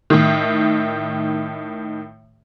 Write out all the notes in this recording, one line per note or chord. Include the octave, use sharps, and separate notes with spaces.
A2 D#3